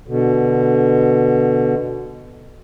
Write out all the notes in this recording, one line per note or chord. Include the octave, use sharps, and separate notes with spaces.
B2 D3